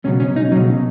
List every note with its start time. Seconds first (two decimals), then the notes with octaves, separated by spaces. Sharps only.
0.05 C#2 B2 F#3 C#4
0.20 C#4
0.36 D#4
0.52 F#3 C#4
0.55 C#2 B2